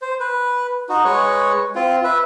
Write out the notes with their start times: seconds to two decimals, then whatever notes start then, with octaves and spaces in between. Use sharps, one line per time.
0.02 C5
0.20 B4
0.89 D#4 F#4
1.05 G#3 B4 C#5 C#6
1.75 C4 F4
2.04 B4 E5